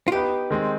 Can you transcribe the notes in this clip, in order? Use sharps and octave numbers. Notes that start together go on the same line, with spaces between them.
F4
B3 D#4 G4 B4
D#3 G#3 C4